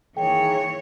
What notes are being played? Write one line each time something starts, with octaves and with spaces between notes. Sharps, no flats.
D#3 E3 A#3 G#4 C#5 G5